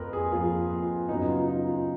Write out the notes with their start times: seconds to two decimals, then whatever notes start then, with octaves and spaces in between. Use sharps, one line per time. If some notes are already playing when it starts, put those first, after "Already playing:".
Already playing: F2 F3 A#3 A#4 B4
0.13 G#4
0.32 F2 F3 A#3 F4
0.71 F4
1.09 F#2 C#3 F#3 B3 D#4
1.29 F4
1.48 D#4
1.67 F4